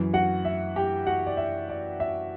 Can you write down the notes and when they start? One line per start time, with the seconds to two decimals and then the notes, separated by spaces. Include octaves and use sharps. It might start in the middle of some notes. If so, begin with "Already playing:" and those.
Already playing: F#2 E3
0.13 F#4 F#5
0.45 E5
0.76 G4 G5
1.07 F#4 F#5
1.27 D5
1.37 E5
1.69 D5
2.00 E5